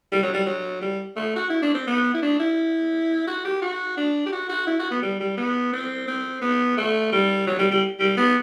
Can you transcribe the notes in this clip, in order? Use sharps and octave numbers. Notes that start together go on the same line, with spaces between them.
G3
F#3
G3
F#3
G3
A3
F#4
E4
D4
C4
B3
E4
D4
E4
F#4
G4
F#4
D4
G4
F#4
F#4
E4
F#4
B3
G3
G3
B3
C4
C4
B3
A3
G3
F#3
G3
G3
G3
B3